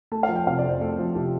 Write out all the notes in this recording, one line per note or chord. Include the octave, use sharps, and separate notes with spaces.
A3 A5
F5
F3
G5
C3 F5
D5
F2
C5
A3 A4
F3
C3 G4